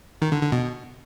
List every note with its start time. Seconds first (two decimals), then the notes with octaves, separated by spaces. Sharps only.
0.22 D#3
0.32 D3
0.42 D3
0.52 B2